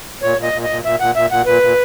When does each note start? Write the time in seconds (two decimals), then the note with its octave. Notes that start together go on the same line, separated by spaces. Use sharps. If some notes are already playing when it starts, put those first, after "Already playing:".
0.22 A#2 C#5
0.38 A#2
0.43 D#5
0.53 A#2
0.64 D#5
0.69 A#2
0.84 A#2 E5
1.00 A#2 F#5
1.15 A#2 E5
1.30 A#2 F#5
1.46 A#2 B4
1.62 A#2